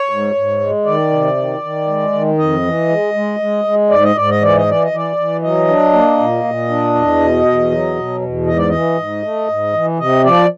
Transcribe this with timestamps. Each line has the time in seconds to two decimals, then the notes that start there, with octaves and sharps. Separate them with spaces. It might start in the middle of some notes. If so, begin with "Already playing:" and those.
Already playing: C#5
0.10 G#2
0.35 G#2
0.60 G#3
0.85 D#3 D5
1.11 C3
1.36 D#3
1.62 D#3
1.87 G#3
2.13 D#3
2.38 F2 D#5
2.63 E3
2.89 G#3
3.14 G#3
3.40 G#3
3.65 G#3
3.90 G#2 D5
4.03 D#5
4.16 G#2 D5
4.30 D#5
4.41 E3 D5
4.57 D#5
4.66 E3 D5
4.83 D#5
4.91 E3 D5
5.16 E3
5.42 F#3 D#5
5.68 D4
5.93 A#3
6.19 A#2
6.44 A#2
6.69 D4
6.95 E2
7.20 B2
7.45 E2
7.71 F#3
7.96 B2
8.22 E2
8.47 G#2 D#5
8.58 D5
8.68 E3 D#5
8.97 G#2
9.23 A3
9.48 G#2
9.73 E3
9.99 C3 D#5
10.24 F3 D5